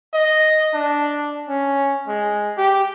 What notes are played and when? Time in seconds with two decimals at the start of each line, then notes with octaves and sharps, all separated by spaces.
0.14 D#5
0.74 D4
1.49 C#4
2.08 G#3
2.57 G4